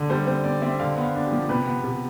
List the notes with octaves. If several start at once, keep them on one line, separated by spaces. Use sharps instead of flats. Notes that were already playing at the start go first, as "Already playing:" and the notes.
Already playing: D3
G3 C5
C4 C5
C4 D5
C4 E5
D3 F5
B3
F5
D4
G4
F3
C3 B4
B3
C3